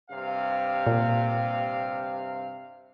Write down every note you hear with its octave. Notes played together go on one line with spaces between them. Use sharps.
G2 C3 F5
A#2